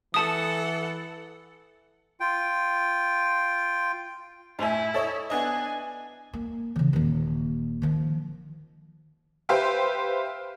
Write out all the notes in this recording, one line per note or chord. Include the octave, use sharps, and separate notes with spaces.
E3 A4 F#5 A5 D#6
F4 G5
A2 E4 G#5
A4 C#5 D#5
B3 D4 D#5 G#5
A#3
C#3 E3
D#1 D#3
D#3 F3
G4 B4 C5 E5 F5 G5